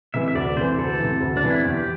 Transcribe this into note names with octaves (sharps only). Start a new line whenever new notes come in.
C3 E3 E5
E5
D2 D5
C3 E3 C5
D2 A4
C3 E3
D2
D4
C3 E3
E4
E2 G4